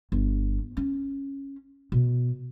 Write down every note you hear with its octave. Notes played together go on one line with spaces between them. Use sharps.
G1
C#4
B2